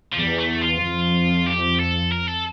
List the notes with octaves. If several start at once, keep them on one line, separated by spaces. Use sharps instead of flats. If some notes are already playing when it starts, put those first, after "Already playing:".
F3
E2 E3 G3
A3
F4
F2 F3
G4
A4
A#4
A4